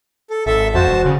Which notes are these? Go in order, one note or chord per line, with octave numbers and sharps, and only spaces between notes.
A4
G#1 A4 E5
F2 F#4 C5 A5
E1
C#3